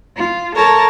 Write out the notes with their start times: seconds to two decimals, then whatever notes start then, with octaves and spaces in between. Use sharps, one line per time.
0.16 F4
0.55 A4 A#4 C#5 A5 A#5